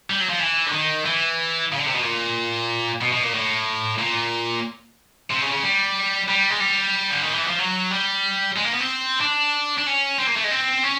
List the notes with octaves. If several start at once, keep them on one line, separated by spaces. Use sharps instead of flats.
G3
F#3
F3
E3
D3
D#3
E3
C#3
D3
C3
B2
A#2
B2
B2
A#2
A2
A#2
C3
C#3
C#3
G3
G3
G#3
G3
D3
D#3
E3
F3
F#3
G3
G#3
A#3
B3
C4
D4
D4
C#4
C4
A#3
A3
G#3
C4
C#4